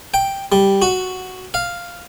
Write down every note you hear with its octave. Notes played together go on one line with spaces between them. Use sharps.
G5
G3
F#4
F5